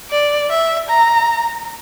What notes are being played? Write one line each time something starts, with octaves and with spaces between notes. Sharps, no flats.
D5
E5
A#5